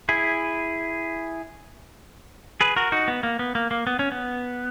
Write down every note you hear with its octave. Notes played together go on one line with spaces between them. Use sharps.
E4 G#4
G#4 B4
F#4 A#4
D#4 F#4
B3
A#3
B3
A#3
A#3
B3
C#4
B3